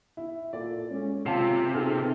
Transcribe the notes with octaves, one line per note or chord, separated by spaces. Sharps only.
E4
A#2 A4 D5
G#3 C#4
F#1 C3 F4 F5 A5
B2 D#4 G#4 A4 F6